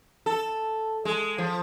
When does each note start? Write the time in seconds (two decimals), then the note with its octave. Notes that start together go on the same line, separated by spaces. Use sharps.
0.26 A4
1.05 G#3
1.38 F3